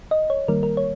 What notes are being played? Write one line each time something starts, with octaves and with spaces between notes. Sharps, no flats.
D#5
C#5
D#3 G3 A#3 A#4
A#4
C#5